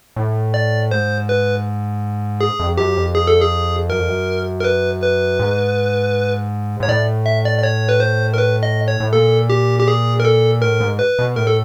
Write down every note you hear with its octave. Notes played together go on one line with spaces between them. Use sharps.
A2
D5
G#2 C5
B4
G#4
F2
F#2 G4
F2
G#4
A4
G#4
F#2 A#4
F2
F#2
A#4
B4
B4
G#2
G#2 C#5
A2 D5
E5
D5
D5
C#5
B4
C5
A#4
B4
D#5
C#5
A2
A#2 A4
G4
G4
G#4
A#4
A4
A2 A#4
G#2
B4
B2
A2 A#4
A4